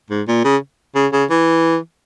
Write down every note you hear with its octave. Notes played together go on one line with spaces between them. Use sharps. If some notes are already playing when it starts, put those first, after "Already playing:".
G#2
A#2
C#3
C#3
C#3
E3